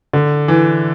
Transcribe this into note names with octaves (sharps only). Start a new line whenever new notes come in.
D3
E3